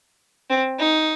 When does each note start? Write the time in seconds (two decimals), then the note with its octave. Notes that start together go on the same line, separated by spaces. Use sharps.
0.50 C4
0.79 D#4